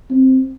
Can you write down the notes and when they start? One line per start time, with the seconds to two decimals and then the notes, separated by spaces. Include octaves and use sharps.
0.10 C4